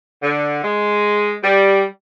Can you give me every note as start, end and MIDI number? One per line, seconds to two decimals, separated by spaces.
0.23 0.62 50
0.64 1.33 56
1.43 1.84 55